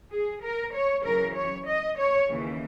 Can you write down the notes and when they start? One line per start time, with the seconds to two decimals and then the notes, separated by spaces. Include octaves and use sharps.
0.12 G#4
0.42 A#4
0.74 C#5
1.04 F#2 C#3 E3 A#4
1.35 C#5
1.66 D#5
1.97 C#5
2.27 D#2 C#3 E3